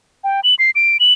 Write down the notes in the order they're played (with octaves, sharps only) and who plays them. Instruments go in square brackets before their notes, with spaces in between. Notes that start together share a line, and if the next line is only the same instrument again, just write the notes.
[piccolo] G5
F#7
C7
D7
F#7